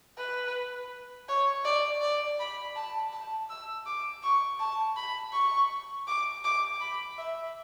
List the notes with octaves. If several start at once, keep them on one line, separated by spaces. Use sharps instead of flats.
B4
C#5
D5
D5
B5
A5
A5
E6
D6
C#6
A5
B5
C#6
D6
D6
B5
E5